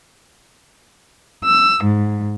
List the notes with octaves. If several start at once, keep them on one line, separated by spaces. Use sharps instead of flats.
E6
G#2